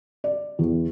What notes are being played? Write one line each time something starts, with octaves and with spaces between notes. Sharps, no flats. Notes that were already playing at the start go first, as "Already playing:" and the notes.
D5
E2